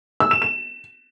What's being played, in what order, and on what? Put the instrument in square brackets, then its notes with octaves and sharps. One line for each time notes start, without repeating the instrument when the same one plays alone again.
[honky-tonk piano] E6
E7
E7